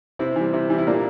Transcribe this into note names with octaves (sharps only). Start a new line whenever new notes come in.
C3 C4 E4
E3 G3
C3
E3 G3
E4
A#2 A#3 D4